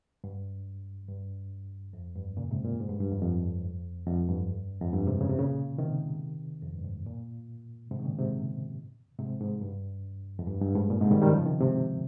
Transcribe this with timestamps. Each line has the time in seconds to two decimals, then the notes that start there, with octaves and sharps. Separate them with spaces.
0.24 G2
1.08 G2
1.93 F2
2.16 G2
2.37 A#2 C#3
2.51 G#2 C3
2.64 A#2
2.80 G#2
2.89 G2
3.00 G2
3.11 F2
3.22 F2
4.07 F2
4.29 G2
4.81 F2
4.93 G2
5.06 G#2 C3
5.21 C#3
5.29 C3
5.38 A#2 C#3
5.78 C3 D#3
6.63 F2
6.74 G2
6.84 G#2
7.06 A#2
7.91 G#2 C3
8.00 D#3
8.05 A#2 C#3
8.19 G#2 C3
9.19 G#2 C3
9.40 G#2
9.61 G2
10.39 F2
10.47 G2
10.62 G2
10.75 G#2
10.90 A#2
11.01 G#2 C3
11.11 D#3 G3
11.22 D#3 G3
11.33 C#3 F3
11.46 C3 D#3
11.61 G#2 C3